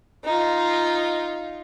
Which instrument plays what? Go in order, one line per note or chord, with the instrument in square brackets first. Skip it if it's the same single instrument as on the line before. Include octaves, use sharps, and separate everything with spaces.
[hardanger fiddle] D#4 F4